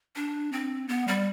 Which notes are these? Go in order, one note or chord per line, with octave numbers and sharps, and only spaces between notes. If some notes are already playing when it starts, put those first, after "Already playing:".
D4
C4
B3
G3